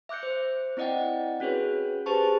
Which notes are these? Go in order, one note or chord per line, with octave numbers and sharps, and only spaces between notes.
E5 D6 F#6 G6 C#7
C5
C4 E4 D5 D#5 F#5 G5
C#4 F#4 G#4 B4 C#5
G4 G#4 B4 C5 A5 C#6